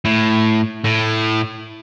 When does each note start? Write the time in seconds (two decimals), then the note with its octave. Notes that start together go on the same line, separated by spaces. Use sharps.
0.05 A2
0.85 A2